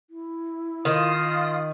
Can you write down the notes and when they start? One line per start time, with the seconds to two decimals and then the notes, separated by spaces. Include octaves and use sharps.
0.10 E4
0.85 D#3 F4 D#6